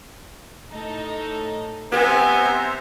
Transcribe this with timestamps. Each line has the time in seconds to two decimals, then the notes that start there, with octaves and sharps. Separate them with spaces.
0.70 A2 D#4 A4
1.92 B3 C4 G4 C5 E5 G#5 A#5